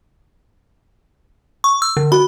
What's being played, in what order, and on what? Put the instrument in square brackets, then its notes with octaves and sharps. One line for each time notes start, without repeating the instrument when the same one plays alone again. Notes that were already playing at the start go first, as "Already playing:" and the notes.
[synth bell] C#6
E6
D3
[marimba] F#4 [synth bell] B5